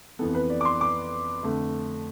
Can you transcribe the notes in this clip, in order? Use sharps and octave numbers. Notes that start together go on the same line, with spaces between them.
F2 E3 B3 A4
B4
D5
D6
C6
D6
F2 D3 A3